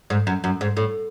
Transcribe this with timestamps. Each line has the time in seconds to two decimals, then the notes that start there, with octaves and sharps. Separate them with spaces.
0.10 G#2
0.27 F#2
0.44 F#2
0.61 G#2
0.77 A2